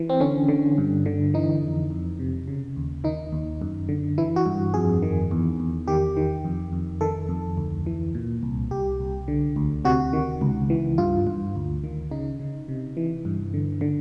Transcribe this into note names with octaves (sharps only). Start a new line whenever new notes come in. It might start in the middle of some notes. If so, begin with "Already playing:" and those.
Already playing: E3
C4
D3 C#4
D3
G2
D3
E3 D#4
F2
F2
C3
C#3
D#2
D#3 D#4
D#2
F#2
D3
E3 E4
F#4
G2
F2 G#4
D#3
E2
E2
D#3 G4
D#3
F2
F2
D#3 A4
F2
D2
E3
A#2
C2
C2 G4
C2
D3
D2
C3 F#4
D#3
C#2
E3
G2 F4
G2
D2
D#3
C#3 D#4
C#3
C3
E3
G2
D3
D3